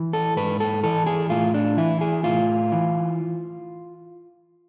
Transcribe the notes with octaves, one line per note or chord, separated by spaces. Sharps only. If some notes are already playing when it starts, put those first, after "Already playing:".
Already playing: E3
A4
G#2 B4
A4
E3 A4
G#4
A2 F4
D4
E3 E4
G#4
A2 F4
E3